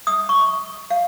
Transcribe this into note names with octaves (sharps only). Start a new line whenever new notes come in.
D#6
C#6
F5